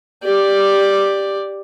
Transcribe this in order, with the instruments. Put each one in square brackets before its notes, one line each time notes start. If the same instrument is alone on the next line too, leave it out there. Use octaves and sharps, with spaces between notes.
[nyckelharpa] G4 D5